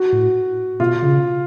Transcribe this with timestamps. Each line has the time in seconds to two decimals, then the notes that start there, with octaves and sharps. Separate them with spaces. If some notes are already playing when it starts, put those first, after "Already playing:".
Already playing: F#4
0.12 A2
0.80 B2 F4
1.02 C#3